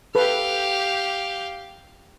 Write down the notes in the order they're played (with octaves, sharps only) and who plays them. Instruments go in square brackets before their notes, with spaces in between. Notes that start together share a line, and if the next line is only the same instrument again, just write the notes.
[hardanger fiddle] G4 F5 [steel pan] A4 B4